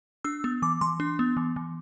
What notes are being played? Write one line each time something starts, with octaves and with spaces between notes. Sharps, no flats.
D4 E6
B3
E3 D6
E3 C6
D4
B3
E3
E3